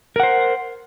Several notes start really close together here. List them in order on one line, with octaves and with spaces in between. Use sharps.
A#4 F#5 C5